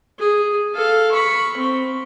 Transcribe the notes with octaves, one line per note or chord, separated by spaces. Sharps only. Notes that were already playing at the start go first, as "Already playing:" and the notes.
G#4
A4 F5
B5 C#6
C4